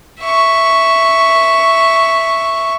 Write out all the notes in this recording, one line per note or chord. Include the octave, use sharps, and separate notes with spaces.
E5 C#6